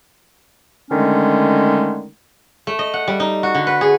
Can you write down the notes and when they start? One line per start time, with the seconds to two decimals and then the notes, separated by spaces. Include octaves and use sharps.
0.91 D3 D#3 G#3 A3 C#4
2.67 A3
2.79 D#5
2.94 F#5
3.08 G3
3.20 D#4
3.43 F#4
3.55 D3
3.67 B4
3.81 G#4